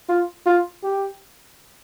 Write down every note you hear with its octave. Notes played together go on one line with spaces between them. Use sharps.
F4
F4
G4